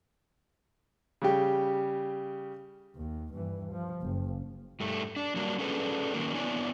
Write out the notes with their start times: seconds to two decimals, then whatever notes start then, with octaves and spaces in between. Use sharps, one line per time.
1.22 C#3 G3 G4
2.96 D#2
3.34 G2 E3
3.72 F3
4.02 F#1
4.80 G2 A3
5.16 D4
5.36 F#3 G3 A#3 D4
5.59 C#4 D4 G#4 A4 B4
6.14 D#3 F#3 A#3 C#4 A#4
6.34 B3 D4 E4 C#5 D5 G#5